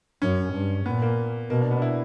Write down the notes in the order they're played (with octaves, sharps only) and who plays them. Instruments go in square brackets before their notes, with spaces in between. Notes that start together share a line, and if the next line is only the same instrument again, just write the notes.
[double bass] F#2 [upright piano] C#4
[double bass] G2
[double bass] A#2 [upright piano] B3
[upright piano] A#3
[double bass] B2 [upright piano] A#3
[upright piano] D4
B3
D4
E4